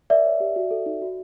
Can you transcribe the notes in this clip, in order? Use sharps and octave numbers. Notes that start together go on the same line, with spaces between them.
A#4 D5 E5
C#5
G4
F#4
A4
D#4
F#4